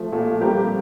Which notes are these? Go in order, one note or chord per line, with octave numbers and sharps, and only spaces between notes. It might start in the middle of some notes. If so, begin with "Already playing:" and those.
Already playing: F3 A3
A#2 A3
G3 A#3 C4 G4 A#4